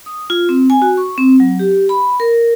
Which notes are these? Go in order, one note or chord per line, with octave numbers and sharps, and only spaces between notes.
D#6
F4
C4
G#5
F#4
C#6
C4
F#3
G4
B5
A#4